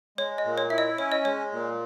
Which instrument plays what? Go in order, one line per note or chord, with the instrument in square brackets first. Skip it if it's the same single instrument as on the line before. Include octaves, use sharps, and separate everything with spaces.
[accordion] G#3 [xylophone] C#5
[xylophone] D#5
[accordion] A#2
[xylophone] C#5
[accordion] E4 [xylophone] E5
[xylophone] D#5
[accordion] C#4 [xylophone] C#5
[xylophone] D#5
[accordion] G#3 [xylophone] C#5
[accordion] A#2